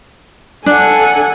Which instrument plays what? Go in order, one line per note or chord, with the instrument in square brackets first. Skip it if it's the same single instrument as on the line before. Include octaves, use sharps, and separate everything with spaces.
[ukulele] D4 [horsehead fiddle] A4 F#5 [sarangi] G#5